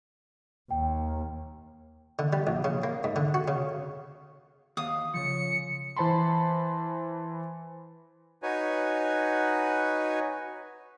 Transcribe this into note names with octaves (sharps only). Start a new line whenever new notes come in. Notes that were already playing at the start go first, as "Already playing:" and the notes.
D#2 G5
D3
G3
A#1
C#3
A#3
G#2
D3
F#4
C#3
D#2 F5 D#6
C#3 F3 C#7
E3 C5 A5 B5 C6
D#4 F#4 B4 C#5 G#5